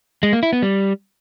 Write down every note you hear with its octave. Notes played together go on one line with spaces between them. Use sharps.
G#3
A#3
E4
B3
G3